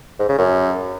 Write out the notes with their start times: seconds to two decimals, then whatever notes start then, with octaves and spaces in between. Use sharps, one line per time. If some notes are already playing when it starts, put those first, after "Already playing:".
0.19 G#2
0.29 C#3
0.38 F#2